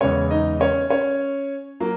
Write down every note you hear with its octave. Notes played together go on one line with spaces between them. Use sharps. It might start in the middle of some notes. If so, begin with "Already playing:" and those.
E2 C#3 G#3 C#4 C#5
D#4 D#5
C#4 C#5
C#4 C#5
F#3 A#3 A#4